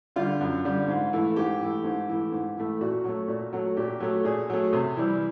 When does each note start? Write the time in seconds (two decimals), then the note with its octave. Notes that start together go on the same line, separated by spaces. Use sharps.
0.16 D3 G3 F4
0.41 F#2
0.64 D3 G3
0.88 G#2
1.13 E3 A3
1.36 G#2 G4
1.61 E3 A3
1.84 G#2
2.09 E3 A3
2.32 G#2
2.57 E3 A3
2.81 A#2 F#4
3.04 F#3 A3
3.28 A#2
3.53 F#3 A3
3.77 A#2 G4
4.00 F#3 A3
4.24 A#2 G#4
4.50 F#3 A3
4.73 C3
4.97 E3 G3